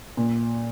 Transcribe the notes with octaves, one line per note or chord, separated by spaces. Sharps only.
A#2